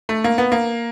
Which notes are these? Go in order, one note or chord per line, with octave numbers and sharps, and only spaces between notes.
A3
A#3
B3
A#3